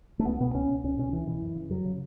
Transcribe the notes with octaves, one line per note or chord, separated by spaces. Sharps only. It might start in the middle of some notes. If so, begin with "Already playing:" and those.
A3
C#2 B3
B2 B3
C#2 C#4
B2
C#2 C#4
B2 C#4
C#2 E3
B2 E3
F#2
C#3
F#2 F#3
C#3